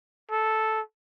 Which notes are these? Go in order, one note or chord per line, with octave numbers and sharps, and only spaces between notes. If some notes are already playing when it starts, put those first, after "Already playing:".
A4